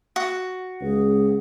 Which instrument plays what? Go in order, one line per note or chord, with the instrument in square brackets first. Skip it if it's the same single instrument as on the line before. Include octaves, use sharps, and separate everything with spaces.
[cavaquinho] F#4
[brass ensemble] C#2 [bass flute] G#4